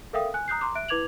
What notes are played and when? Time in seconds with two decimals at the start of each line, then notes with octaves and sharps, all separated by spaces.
0.13 A4 A#4 E5 F5 G5 D#6
0.34 G#5 F#6
0.48 A#5 D#6 F#6 G6 C7
0.61 A#5 C6 D6
0.75 E5 F#6 D7
0.88 E4 B4 D6 G#6 F7 F#7